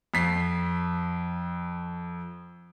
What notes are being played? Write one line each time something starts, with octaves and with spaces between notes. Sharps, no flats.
F2 B6 C7